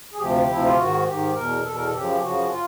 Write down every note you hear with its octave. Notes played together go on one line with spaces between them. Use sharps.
G#4
D2 C3 F3 G4
D2 C3 F3 E4
F4
G#2 D#3 F#4
G#2 D#3 G4
E2 B2 A#4
E2 B2 A4
A#4
A4
F#2 C#3 F3 G4
F#2 C#3 F3 F#4
F4